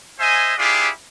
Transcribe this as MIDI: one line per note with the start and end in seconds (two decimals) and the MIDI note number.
0.20 0.53 72
0.20 0.53 75
0.20 0.53 76
0.20 0.53 80
0.58 0.89 62
0.58 0.89 64
0.58 0.89 65
0.58 0.89 67
0.58 0.89 68